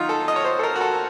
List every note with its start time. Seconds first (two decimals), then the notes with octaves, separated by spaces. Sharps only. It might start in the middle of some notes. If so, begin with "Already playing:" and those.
Already playing: D#3 F#3 D#4 F4
0.09 A4
0.28 D#5
0.36 C#5
0.45 C5
0.59 A4
0.63 A#4
0.75 F#4
0.81 A4